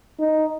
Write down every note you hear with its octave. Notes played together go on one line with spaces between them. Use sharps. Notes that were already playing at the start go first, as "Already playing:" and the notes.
D#4